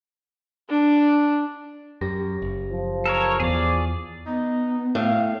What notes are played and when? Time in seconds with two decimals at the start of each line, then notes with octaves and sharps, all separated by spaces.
0.70 D4
2.01 F#2 G4 A#6
2.42 F#1
2.72 F3
3.06 A4 A#4 C#5
3.40 E2 G#4 D5
4.27 B3 D#4
4.95 A2 F5